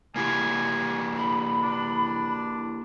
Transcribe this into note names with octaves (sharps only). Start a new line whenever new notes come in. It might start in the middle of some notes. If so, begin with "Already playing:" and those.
A#3 E4 G4 G#5
B5
D4